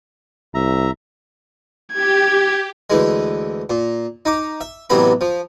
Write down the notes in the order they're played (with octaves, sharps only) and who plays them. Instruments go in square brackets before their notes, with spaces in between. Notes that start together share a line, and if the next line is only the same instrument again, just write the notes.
[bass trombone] C2 [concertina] E5 A#5
[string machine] G4 [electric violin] G#6
[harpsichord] D2 E3 G#3
A#2
D#4 D6
E5
A1 C3 F#3 B3 B5
F3